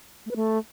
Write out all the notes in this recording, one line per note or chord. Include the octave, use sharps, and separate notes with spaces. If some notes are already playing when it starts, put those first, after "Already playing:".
A3
B4
A3